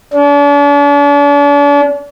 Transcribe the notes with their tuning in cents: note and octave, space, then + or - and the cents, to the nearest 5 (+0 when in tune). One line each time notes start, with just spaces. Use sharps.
D4 -40